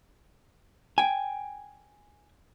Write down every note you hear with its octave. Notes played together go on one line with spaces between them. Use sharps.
G5 G#5